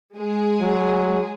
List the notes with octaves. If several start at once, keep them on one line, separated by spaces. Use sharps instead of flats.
G#3 G#4
F#3